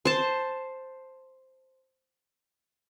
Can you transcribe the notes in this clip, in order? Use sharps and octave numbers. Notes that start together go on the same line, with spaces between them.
C5 A5